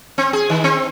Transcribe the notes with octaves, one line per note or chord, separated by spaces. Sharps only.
C4
G#4
D#3
C4